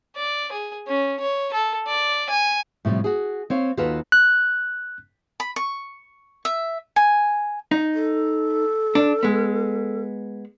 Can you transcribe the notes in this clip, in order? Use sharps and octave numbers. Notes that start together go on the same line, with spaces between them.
D5
G#4
C#4
C#5
A4
D5
G#5
A2 C3 F3 G3
F#4 G#4
C4 C#5 F5
D#2 F4 F#4 A4 B4 F5
F#6
B5
C#6
E5
G#5
D#4
A4
D4
G#3 B3